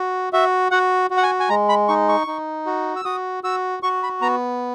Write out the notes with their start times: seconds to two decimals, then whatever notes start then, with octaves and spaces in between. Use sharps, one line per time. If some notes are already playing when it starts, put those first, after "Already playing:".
Already playing: F#4
0.33 F#4 E5
0.71 F#4 F#5
1.10 F#4
1.17 F#5
1.23 G#5
1.40 G#5
1.49 G#3 A#5
1.69 B5
1.88 D#4 C#6
2.09 C#6
2.27 D#4
2.66 F#4
2.96 E6
3.05 F#4 D#6
3.44 F#4 E6
3.83 F#4 C#6
4.03 B5
4.21 B3 A#5